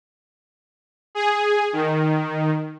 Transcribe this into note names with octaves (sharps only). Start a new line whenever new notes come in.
G#4
D#3